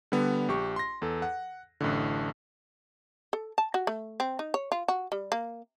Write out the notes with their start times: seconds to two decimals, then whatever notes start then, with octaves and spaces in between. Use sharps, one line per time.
0.12 D3 G3 B3
0.48 A#1 G4 C#6
0.76 C6 A#6
1.02 E2 A4
1.22 F#5
1.81 A1 F#2 A2 D3
3.33 A4
3.58 A5
3.74 F#4
3.87 A3
4.20 C4
4.39 D#4
4.54 C#5
4.72 F4
4.88 F#4
5.12 G3
5.32 A#3